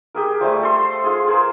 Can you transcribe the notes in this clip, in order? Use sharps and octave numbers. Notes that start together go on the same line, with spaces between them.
G4 G#4 A#4
F3 G3 A3 G#5
A4 C6
F4 G#4
G#4 A#4 C5